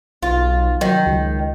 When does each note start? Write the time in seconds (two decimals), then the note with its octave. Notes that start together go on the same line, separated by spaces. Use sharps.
0.23 B1 F4
0.81 D#3 F#3
1.07 C#2